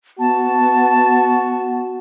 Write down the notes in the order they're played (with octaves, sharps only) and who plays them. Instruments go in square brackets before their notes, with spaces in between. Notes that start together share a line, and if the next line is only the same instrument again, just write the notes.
[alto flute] B3 [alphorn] F#4 [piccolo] A5